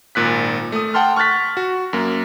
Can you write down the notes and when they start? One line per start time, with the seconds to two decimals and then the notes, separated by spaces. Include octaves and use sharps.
0.15 G#1 A#2 F#6 B6
0.72 A3 D#6
0.94 F#5 G5 A5 C6 F6
1.16 C#6 F6 F#6 A6 B6
1.57 F#4
1.93 F#2 A#3